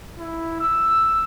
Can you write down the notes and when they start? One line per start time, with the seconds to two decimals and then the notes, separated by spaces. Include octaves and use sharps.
0.19 E4
0.60 E6